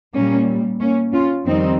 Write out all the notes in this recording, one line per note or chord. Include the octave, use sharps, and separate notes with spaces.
A#2 G3 A#3 C#4
A#3 C#4
C#4 F4
F2 D#3 G3 C4 D#4